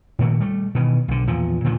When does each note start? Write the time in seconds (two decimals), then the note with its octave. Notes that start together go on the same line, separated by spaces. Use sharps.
0.19 A#2 D#3 A3 A#3
0.40 G3 A3
0.75 B2 D#3 E3
1.08 B1 D3
1.27 E2 A#2 F3
1.65 A#2 D3 D#3 F3